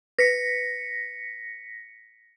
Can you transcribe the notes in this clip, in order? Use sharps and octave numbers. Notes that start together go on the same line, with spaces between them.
B4 A#6 B6 C#7